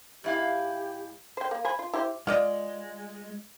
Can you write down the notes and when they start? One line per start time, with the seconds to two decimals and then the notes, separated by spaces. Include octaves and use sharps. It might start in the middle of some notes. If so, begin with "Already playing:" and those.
0.24 G#2 E4 G4 F5
1.37 C5 G5
1.51 A#3
1.65 C5 G#5 B5
1.79 F4
1.93 E4 G4 C5
2.27 G#3 F4 D5 D#5